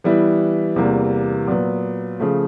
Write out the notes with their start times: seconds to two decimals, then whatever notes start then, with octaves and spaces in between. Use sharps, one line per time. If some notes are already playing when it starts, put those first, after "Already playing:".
0.04 E3 G3 B3 E4
0.76 E2 C3 E3 G3 A#3
1.48 A#2 F#3 B3
2.19 C#3 F3 A3